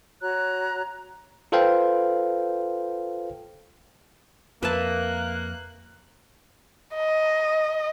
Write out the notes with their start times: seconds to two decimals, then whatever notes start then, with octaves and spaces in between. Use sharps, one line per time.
0.21 F#4 C#5 A#5 F#6
1.52 F4 A4 B4 C5 F5 G5
4.63 F2 A#3 B4 E5 A5 F#6
6.96 D#5